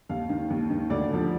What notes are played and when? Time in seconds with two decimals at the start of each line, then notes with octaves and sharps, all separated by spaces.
0.09 D#2 F5
0.29 D#3
0.50 D#2
0.70 D#3
0.90 D2 D5
1.11 D3 F3